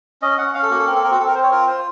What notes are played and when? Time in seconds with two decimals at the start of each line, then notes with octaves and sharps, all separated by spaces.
0.22 C#4 D#5
0.38 C#4 F#5
0.54 C#4 F5
0.63 A4
0.71 A#3 F#4
0.79 A4
0.87 C4 A#4
0.96 A4
1.03 C4 A#4
1.11 F#4
1.20 C4 A4
1.28 A#4
1.35 C4 C5
1.43 C#5
1.51 F4 A#4
1.68 F4 C5